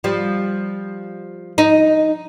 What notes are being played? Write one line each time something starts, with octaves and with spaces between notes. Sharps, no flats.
F3 G3
D#4